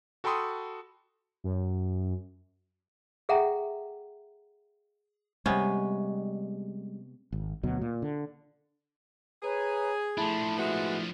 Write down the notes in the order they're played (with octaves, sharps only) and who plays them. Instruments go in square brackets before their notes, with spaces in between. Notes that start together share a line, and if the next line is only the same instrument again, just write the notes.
[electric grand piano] F#4 A4 G5 B5 C6 D#6
[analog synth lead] F#2
[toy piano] G#4 A4 E5 F#5 G5 A#5
[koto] C3 B3 C#4 [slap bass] G3 G#3
[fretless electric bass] G#1
D2 B2 F#3
A#2
D3
[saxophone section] G#4 [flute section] B4 C#5 A#5
[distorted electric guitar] F3 D4 [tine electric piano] A3 E4 [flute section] A5 B5
[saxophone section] G#3 B3 F#4 [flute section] E5